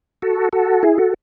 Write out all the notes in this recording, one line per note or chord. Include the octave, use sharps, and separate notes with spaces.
F#4 A4
F#4 A4
E4 G#4
F#4 A4